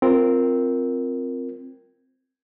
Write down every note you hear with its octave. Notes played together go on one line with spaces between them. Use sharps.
C4 F4 A#4